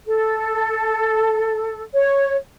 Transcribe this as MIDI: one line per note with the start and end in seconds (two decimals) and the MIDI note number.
0.06 1.82 69
1.94 2.37 73